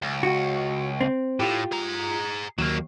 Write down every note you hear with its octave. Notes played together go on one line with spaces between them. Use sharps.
C#2
F#4
C4
A2 F4 G4
G#4 A#5
D#2 F#3 A#3